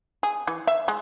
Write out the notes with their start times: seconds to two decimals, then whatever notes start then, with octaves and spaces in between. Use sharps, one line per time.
0.23 G#4
0.47 E3
0.67 E5
0.88 G#3